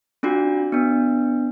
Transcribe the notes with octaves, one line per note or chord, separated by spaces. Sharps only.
C4 D4 F4 F#4
B3 D4